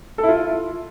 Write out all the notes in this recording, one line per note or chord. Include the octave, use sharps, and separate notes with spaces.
A4
E4
F4